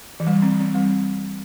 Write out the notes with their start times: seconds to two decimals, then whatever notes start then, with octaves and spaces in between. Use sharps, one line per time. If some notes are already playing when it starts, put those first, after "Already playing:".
0.20 E3
0.27 G3
0.42 C4
0.60 C4
0.75 G3